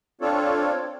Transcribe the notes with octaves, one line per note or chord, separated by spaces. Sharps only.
C4 D4 F4 A4 C#5